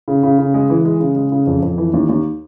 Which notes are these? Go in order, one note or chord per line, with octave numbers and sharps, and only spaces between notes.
C#3
C#3
C#3
G#3
E3
G#3
C#3
G#3
C#3
F2
F2
E3
D#2
D#2